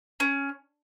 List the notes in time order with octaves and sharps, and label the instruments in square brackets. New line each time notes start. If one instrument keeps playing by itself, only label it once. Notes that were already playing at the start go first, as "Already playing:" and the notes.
[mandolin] C#4